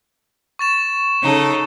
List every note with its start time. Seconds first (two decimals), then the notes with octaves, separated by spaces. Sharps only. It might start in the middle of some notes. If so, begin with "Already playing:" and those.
0.59 C#6 A6 E7
1.22 C#3 D#4 A4